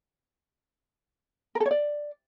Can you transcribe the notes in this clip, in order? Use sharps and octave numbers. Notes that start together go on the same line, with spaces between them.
A#4
A4
C#5
D5